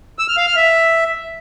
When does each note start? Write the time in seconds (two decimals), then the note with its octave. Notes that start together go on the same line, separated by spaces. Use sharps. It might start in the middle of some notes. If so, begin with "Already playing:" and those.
0.19 E6
0.28 F6
0.37 F5
0.47 F6
0.56 E5